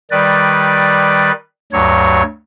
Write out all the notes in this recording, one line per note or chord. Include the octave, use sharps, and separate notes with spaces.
D#3 G3 B4 D5
D2 G2 F#3 C#5